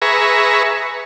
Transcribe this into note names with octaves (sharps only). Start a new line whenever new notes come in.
G#4 B4 E5 A#5 C#6